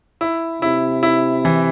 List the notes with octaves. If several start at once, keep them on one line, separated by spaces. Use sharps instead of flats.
E4
C3 E4
E4
E3